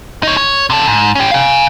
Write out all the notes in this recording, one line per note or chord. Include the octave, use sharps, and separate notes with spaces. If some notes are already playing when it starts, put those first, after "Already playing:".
D#4 C#5
C#5
C3 A4
G#2
C#4 G4
F5 G#5